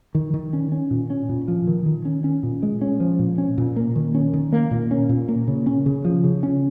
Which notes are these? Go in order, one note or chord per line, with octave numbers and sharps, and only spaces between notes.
D#3
D#3
C#4
C#4
A#2
C#4
A#2
F3
D#3
D#3
C#4
C#4
A#2
G#3
C#4
F3
A#2
C#4
A#2
A#3
D#3
C#4
D#3
A#3
A#2
C#4
A#2
A#3
C#3
C#4
C#3
F3
C#3
C#4